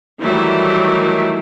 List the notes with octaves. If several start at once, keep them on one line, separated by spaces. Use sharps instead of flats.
D#3 E3 F#3 G3 A3 E4